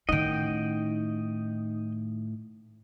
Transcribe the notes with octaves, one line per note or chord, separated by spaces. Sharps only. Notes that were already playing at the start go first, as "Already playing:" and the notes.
A2 D#3 C#4 D#4 D#5 F#5 G5